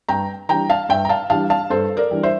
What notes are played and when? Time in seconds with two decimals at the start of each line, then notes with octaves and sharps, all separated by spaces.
0.09 G2 G5 A#5
0.49 E3 G3 D4 G5 A#5
0.70 F5 A5
0.89 G2 E5 G5
1.05 A#5
1.09 F5 A5
1.30 E3 G3 D4 F5 A5
1.50 F5 A5
1.70 G2 A4 C5
1.97 A#4 D5
2.11 E3 G3 D4
2.23 C5 E5